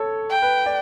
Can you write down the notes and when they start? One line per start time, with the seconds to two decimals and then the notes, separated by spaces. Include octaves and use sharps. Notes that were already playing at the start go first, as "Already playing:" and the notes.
Already playing: A4 C#5
0.31 G5
0.42 B4
0.66 D5